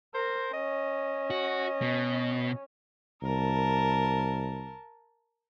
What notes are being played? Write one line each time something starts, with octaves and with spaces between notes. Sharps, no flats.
A#4 C5
C#4 D#5
F#4
B2
C2 A#4 A5